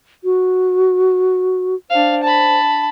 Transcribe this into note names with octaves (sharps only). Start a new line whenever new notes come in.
F#4
D4 C5 F5
A5 B5